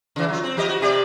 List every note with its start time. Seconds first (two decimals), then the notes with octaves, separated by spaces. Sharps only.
0.16 C#3 E3
0.28 F#3 F4
0.43 C4
0.57 F3 G4 D#5
0.69 F#4
0.81 C3 G4 D5